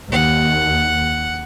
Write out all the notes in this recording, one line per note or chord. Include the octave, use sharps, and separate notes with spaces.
D#2 F#5